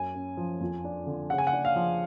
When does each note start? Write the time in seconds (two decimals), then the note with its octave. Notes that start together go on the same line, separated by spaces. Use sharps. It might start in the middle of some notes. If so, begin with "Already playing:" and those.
Already playing: F#2 G#5
0.15 C#4
0.37 F3
0.61 F2
0.84 D4
1.06 D3
1.30 C#3 F#5
1.38 G#5
1.47 F#5
1.53 D4
1.65 F5
1.76 F3